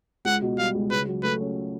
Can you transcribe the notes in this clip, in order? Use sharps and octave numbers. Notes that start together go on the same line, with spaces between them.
C#2 F#5
B2
G3 F5
C#2
C#3 B4
F#3
A3 B4
C#4